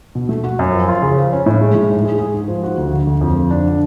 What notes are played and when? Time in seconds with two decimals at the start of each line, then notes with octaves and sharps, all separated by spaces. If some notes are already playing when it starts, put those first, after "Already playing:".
0.15 B2
0.29 A3
0.44 F#4
0.59 F#2
0.73 F3
0.88 F4
1.02 C#3
1.17 F3
1.32 C#4
1.46 A2
1.61 G#3
1.75 A2
1.90 G#2
2.04 G#3
2.19 G#4
2.34 G#2
2.48 F3
2.63 F#4
2.78 D2
2.93 D3
3.07 D2
3.21 F2
3.37 F3
3.51 D4
3.66 D3